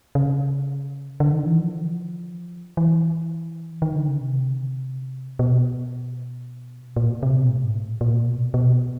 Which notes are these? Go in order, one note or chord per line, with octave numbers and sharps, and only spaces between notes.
C#3
D3
D#3
E3
F3
E3
D#3
D3
C#3
C3
B2
A#2
C3
B2
A2
G#2
A2
A#2
A#2
B2
B2